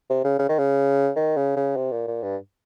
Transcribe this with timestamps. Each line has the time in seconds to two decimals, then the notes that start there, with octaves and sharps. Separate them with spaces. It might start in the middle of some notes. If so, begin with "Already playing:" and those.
0.10 C3
0.24 C#3
0.39 C#3
0.49 D#3
0.58 C#3
1.16 D#3
1.37 C#3
1.56 C#3
1.76 C3
1.92 A#2
2.08 A#2
2.22 G2